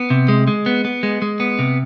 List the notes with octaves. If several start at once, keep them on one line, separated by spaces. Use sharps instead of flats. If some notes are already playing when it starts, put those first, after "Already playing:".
Already playing: B3
C3
G#3
G#3
B3
B3
G#3
G#3
B3
C3